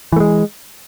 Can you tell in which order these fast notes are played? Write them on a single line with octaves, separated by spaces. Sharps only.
E3 A3 G#3